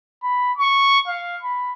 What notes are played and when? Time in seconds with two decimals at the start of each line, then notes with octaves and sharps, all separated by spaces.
0.23 B5
0.58 C#6
1.08 F5
1.43 B5